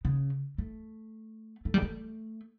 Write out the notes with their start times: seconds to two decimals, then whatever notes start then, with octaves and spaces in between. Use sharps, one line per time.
0.05 C#3
0.58 A3
1.65 A3
1.74 G3
1.82 A3